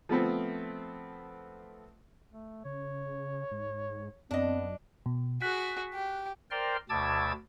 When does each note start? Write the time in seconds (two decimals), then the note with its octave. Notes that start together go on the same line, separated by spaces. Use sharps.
0.09 F3 A3 B3 C4
2.31 A3
2.65 C#3 C#5
3.51 G#2
4.31 F#2 B3 C4 D4 D#5
5.06 B2
5.42 F#4 G#4 F#6 B6
5.94 G4
6.51 A#4 C5 D5 G5 C6 F6
6.89 D2 B2 A5 D6 E6 G#6